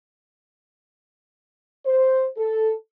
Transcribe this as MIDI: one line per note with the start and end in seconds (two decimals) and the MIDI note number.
1.86 2.26 72
2.37 2.72 69